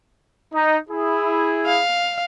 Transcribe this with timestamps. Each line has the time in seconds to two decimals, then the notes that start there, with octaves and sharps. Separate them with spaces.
0.54 D#4
0.89 E4 G#4
1.66 F5